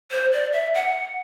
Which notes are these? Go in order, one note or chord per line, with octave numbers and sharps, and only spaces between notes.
C5
D5
E5
F#5